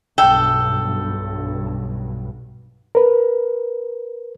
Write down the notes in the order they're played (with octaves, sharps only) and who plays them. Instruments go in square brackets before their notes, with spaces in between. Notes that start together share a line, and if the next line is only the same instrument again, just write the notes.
[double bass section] B1 G2 [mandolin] A4 [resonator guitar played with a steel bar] G5
[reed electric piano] A#4 B4